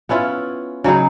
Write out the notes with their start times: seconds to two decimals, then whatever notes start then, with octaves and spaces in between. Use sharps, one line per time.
0.09 B3 C#4 E4 F4
0.84 C#3 F#3 D#4 G#4